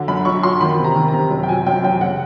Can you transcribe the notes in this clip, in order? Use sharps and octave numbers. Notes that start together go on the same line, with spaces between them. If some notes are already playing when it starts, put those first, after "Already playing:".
Already playing: D3 F#3
F#2 B5
F#2 C#6
F#3 C6
D#3 B5
C3
A#5
D#3
A#5
C3
F#2
G5
F#3 G#5
F#2 G5
F#2 G5
C#3 F#5